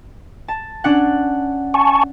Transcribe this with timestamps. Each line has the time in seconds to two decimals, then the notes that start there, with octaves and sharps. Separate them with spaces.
0.48 A5
0.84 C#4 D4 F#5
1.74 G#5 A5 C#6